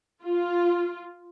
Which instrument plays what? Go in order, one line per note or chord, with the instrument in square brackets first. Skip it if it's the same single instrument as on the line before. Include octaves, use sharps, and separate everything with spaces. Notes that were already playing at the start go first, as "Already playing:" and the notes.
[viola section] F4